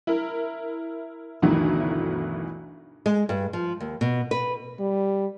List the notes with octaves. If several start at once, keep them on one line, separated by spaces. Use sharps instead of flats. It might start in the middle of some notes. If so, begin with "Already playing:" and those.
E4 A#4
G1 D2 B2 D#3 E3 F#3
G#3
G2
F3
D#2
B2
B4
G3